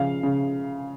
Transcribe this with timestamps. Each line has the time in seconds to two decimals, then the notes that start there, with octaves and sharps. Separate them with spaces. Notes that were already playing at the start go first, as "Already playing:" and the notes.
Already playing: C#3 F3 F5
0.23 C#3